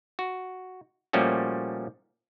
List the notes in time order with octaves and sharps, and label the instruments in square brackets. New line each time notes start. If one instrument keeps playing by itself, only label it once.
[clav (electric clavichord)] F#4
A#2 F3 G3 A3 C#4 F#4